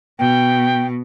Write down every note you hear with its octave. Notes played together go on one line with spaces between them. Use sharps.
B2 G5